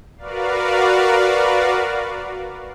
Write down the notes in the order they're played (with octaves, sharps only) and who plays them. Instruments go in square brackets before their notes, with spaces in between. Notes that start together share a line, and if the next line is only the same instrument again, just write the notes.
[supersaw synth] F#4 A#4 B4 D5 F5